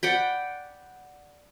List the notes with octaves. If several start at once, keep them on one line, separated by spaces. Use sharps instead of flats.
D5 F#5 G5 B5